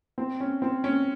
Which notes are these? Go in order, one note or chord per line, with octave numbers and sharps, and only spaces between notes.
C4
C#4
C4
C#4